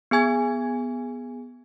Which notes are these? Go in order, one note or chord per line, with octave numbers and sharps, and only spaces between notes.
B3 G#4 G#5 G#6